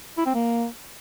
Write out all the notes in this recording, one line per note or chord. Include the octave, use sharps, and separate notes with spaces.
E4
C4
A#3